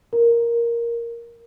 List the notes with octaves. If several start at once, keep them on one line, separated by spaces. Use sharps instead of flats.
A#4